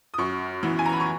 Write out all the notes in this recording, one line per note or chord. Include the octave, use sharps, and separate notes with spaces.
D#6
F#2 C#6
E3 B3
G#5
A#5
B5
C#6